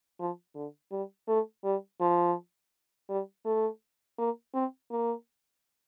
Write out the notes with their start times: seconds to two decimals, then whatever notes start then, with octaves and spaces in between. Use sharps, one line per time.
0.19 F3
0.55 D3
0.91 G3
1.28 A3
1.64 G3
2.01 F3
3.09 G3
3.45 A3
4.19 A#3
4.54 C4
4.91 A#3